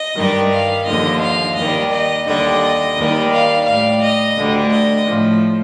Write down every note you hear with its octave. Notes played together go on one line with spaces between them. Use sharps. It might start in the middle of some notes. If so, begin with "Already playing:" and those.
Already playing: D#5
G2 D#3 G3
F5
D#2 D3 F3 D#5
F5
D#2 D#3 G3 D#5
D#5
D#2 D3 G3 D#5
D#2 D#3 G3
F5
A2 G3 F5
D#5
D2 D3 G3
D#5
A2 F3